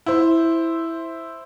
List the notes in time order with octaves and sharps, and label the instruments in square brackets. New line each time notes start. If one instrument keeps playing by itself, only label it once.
[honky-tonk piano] E4 C5